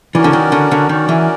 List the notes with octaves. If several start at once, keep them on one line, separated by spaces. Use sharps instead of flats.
E3 C#4 F#4 A#4 D5
D3
D#3
D3
D3
D#3 C#4 F#4 A#4 D5
E3